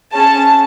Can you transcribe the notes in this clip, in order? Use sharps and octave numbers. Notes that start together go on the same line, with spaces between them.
C#4 G#4 A5